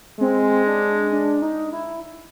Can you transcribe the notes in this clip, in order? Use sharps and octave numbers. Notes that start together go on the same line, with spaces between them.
G#3 C4
D4
D4
D#4
E4